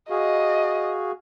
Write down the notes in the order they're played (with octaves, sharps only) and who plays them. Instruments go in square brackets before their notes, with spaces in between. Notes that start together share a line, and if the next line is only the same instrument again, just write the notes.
[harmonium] F#4 G#4 F5 [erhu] D#5